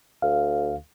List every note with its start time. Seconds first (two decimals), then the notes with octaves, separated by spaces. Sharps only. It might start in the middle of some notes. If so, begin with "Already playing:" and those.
0.22 D2 F5